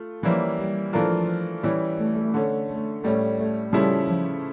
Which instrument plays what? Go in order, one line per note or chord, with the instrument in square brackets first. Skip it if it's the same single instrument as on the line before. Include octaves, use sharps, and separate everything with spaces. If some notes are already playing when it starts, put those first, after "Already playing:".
Already playing: [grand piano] A3 F4
[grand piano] E3 G3 A#3 C#4 E4 [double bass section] F3
[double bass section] G3
[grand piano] E3 A3 D4 F4 A#4 [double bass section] F3
[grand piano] E3 G3 C#4 E4
[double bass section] A3
[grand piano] D3 A3 C#4
[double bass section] A3
[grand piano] A2 G3 C#4 [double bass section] A3
[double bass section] A3
[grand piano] C#3 F3 A3 C#4 E4 [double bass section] G3
[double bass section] F3